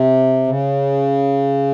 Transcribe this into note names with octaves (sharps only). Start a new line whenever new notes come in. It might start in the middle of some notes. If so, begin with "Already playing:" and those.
Already playing: C3
C#3